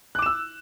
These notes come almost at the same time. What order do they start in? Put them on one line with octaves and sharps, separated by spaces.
F#6 D6 E7 E6